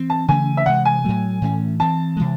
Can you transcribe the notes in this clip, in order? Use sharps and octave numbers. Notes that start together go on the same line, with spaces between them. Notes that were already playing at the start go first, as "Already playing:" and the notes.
Already playing: E3 C4
A5
C#3 E3 A3 C#4 G#5
E5
C3 E3 G#3 F#5
G#5
A2 F#3 A3
A2 E3 A3 C#4
E3 C4 A5
C3 E3 G#3